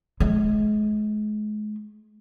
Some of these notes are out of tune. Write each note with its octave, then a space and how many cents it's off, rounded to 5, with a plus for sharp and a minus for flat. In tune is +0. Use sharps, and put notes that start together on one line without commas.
G#3 +35